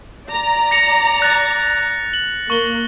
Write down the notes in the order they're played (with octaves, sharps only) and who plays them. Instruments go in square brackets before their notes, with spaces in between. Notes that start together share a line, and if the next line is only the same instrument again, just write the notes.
[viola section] D5 A#5
[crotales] A#6 C#7 F7
F#6 A6
F#7
[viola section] A#3 [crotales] C#6 G7